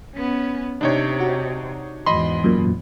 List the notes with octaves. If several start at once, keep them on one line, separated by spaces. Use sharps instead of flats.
B3 C#4
C3 D4 D#4 C#5
F#4
E2 G#2 D#5 B5 C6
F#2 A#2